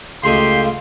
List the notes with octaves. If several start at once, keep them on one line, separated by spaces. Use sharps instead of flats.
C#2 A3 G4 D#5 F5 C6